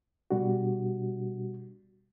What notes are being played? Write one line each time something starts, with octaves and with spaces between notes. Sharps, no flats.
B2 G3 D4 F#4